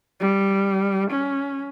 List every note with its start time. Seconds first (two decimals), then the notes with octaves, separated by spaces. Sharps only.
0.20 G3
1.11 C#4